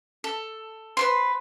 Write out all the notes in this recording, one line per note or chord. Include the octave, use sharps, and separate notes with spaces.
A4
B4 C5 C6